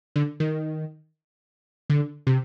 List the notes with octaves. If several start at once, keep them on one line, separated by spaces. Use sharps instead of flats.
D3
D#3
D3
C3